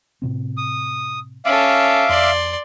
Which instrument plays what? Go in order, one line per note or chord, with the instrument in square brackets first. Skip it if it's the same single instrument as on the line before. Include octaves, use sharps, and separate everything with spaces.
[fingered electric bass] A2 C3 C4
[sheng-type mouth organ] D#6
[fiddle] C#4 A4 [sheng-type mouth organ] E5 F5 D6
[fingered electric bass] F2 [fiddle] D5 C6